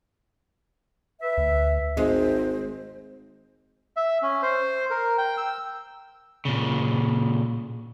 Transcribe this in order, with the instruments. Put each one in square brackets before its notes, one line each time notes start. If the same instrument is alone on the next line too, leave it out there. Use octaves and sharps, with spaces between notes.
[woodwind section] B4 E5
[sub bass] D2
[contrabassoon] G#1 [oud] G#3 [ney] C5
[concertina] E5
C#4
C5
A#4
G5
E6
[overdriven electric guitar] A#2 C#3